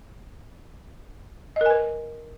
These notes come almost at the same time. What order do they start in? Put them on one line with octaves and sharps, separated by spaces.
D#5 A#4 G#5 B4